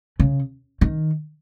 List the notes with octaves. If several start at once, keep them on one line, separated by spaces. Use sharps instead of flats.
C#3
D#3